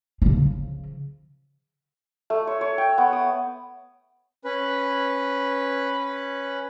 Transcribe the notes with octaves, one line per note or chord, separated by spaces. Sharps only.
C#3 F3
A3
C#5
C#5
G5
B3
D#6
C#4 B4